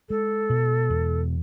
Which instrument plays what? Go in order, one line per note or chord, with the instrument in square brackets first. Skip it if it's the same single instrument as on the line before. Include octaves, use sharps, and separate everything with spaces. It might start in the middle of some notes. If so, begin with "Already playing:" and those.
[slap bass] G#3 [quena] A4
[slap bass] B2
E2